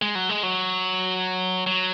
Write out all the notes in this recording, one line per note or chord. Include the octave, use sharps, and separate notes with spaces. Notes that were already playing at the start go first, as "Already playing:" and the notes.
G#3
F#3
G#3
F#3
F#3